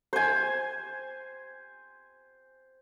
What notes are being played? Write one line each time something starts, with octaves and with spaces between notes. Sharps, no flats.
C5 G#5